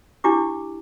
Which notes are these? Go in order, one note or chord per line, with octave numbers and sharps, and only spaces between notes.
D4 E4 G4 D6